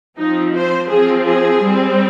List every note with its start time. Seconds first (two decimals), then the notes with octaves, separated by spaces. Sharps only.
0.18 F3 C4 D#4
0.54 C5
0.90 F3 C4 G#4
1.26 G#4
1.62 G3 C4